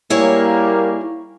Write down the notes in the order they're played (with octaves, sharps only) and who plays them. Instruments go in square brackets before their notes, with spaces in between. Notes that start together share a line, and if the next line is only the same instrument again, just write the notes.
[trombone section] G3 A#3 [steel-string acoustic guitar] E4 G#4 C#5